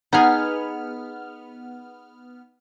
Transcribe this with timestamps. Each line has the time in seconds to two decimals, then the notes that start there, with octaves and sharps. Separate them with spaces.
0.13 B3 D#4 G#4 F6